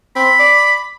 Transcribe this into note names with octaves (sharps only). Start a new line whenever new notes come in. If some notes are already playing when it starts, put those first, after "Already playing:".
C4 B5
D5